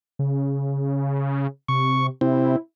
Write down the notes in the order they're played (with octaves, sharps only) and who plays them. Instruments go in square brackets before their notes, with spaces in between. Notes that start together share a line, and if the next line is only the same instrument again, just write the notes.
[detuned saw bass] C#3
[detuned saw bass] C3 [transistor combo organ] C#6
[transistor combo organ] C3 C4 [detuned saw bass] E4